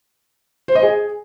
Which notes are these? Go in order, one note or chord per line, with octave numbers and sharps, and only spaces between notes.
C5
D#5
G#4